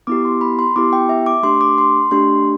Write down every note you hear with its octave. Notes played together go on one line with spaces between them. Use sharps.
B3 E4 G4 D6
C6
B5
C6
B3 E4 G4 D6
G5
E5
D6
A3 D4 G4 C6
D6
C6
A3 D4 G4 C6